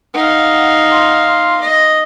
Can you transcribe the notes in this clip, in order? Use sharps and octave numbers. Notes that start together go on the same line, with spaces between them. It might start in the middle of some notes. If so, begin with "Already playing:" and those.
D#4 F5 F#5
C6
C6
D#5 A#6